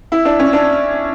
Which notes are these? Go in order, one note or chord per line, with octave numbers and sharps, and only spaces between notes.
E4
D4
C#4
D4